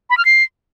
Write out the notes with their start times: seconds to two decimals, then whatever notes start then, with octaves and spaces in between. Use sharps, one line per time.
0.10 B5
0.18 F6
0.25 C7